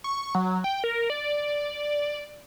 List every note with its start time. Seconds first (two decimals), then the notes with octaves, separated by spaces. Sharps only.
0.04 C#6
0.35 F#3
0.64 G5
0.84 A#4
1.10 D5